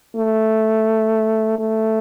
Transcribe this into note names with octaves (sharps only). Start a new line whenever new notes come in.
A3
A3